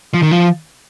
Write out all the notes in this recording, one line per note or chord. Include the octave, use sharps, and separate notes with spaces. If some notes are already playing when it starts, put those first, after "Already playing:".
F3
D#3
F3